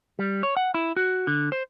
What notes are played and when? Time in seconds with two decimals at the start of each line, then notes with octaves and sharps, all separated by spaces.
0.19 G3
0.43 C#5
0.57 F#5
0.74 E4
0.97 F#4
1.27 D3
1.52 C5